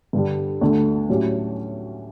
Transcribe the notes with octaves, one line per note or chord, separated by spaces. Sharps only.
G2 D3 G3
D2 D3 A3
A2 F#3 C#4 G4